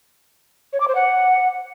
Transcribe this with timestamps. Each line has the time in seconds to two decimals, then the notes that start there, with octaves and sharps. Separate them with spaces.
0.73 C#5
0.80 D6
0.88 C5
0.95 F#5